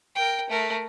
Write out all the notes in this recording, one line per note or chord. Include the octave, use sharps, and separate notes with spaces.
A#4 G5
A3 A#4